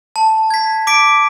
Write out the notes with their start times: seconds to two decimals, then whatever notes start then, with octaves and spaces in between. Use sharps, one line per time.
0.16 A5
0.50 G#6 B6
0.87 D6 B6 D7